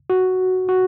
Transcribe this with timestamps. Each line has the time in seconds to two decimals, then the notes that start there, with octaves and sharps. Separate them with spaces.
0.10 F#4
0.69 F#4